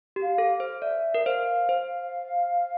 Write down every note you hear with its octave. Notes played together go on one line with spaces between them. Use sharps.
G4
F5
A4
C5
D5 E5
A#4
C5 F5
C5